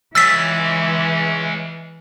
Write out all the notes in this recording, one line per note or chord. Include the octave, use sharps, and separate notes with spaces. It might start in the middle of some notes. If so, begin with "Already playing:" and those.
E3 G#3 C#4 E6 A6 B6